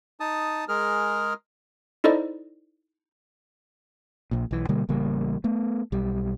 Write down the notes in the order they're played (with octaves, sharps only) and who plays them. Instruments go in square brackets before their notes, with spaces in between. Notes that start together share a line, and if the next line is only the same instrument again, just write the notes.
[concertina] D#4 A5 D#6
G#3 G#4 A#4 F6
[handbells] D#4 E4 A4 C5 D5 D#5
[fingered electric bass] A#1 A#2
B1 E3
B2 D3 G3 A#3
A1 C#3 G3 A#3
A3 B3
B1 G3